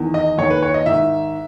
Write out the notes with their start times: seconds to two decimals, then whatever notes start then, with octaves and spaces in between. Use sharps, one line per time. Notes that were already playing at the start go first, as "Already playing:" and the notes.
Already playing: E2 D#3
0.14 D#5
0.38 D#2 D#3 C#5
0.50 B4
0.62 C#5
0.74 D#5
0.86 G#2 D#3 E5